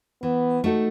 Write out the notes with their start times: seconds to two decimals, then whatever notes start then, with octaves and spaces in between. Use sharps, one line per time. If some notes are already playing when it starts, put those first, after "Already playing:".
0.23 E3 B3
0.64 A3 D#4 F#4 A4